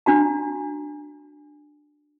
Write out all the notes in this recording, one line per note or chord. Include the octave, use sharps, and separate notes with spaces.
D4 F#4 A#5